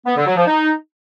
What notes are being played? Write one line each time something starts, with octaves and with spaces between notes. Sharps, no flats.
B3
D3
F#3
F3
D#4